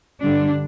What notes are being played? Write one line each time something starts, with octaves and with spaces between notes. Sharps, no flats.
G2 D3 G3 D4